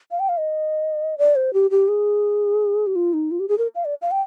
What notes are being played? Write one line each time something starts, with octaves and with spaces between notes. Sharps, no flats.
F5
G5
F5
D#5
D5
C5
G4
G4
G#4
G4
F4
D#4
F4
G4
G#4
A#4
F5
D5
F5
G5